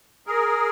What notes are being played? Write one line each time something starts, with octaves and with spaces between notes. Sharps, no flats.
G#4 A#4